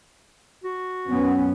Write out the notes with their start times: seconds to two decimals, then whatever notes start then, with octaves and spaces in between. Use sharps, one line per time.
0.64 F#4
1.08 F#2 B3 C#4